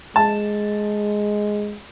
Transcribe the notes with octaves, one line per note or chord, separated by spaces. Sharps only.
G#3 A5